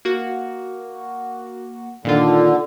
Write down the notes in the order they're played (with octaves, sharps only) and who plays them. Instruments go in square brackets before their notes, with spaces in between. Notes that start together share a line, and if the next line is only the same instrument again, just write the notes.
[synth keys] A#3 F#4
[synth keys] A#2 D#3 F4 [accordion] D3